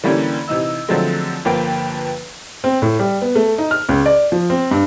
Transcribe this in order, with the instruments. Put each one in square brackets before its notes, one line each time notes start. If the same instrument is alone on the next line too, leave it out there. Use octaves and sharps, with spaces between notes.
[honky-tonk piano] D3 E3 G3 A#3 C#4
C3 E3 D#4 E6
D3 F3 F#3 G#3 A3 C4
G1 F3 A#3 B4 G5
[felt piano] C4
A2
G3
B3
A3
D#4
F6
C#2
D5
F3
C4
G2